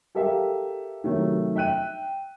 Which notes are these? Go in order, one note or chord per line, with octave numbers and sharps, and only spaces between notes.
G4 A4 A#4 E5 F5
C3 D#3 F#3 A3
E5 G5 F#6 D#7